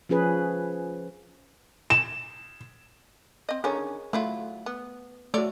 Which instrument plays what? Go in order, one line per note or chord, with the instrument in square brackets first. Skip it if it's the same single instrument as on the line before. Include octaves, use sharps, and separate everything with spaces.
[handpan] F3 C#4 G#4 B4
[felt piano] E7
[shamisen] C4 D#5
[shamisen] D3 D#3 C#4 [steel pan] G#4 A#4 C#5
[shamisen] F#3 E4 F4 [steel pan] A3
[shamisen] B3
[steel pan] A3 F#4 [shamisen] A4 C#5 D5